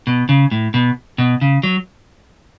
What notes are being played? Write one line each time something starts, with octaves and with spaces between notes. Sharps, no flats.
B2
C#3
A2
B2
B2
C#3
F#3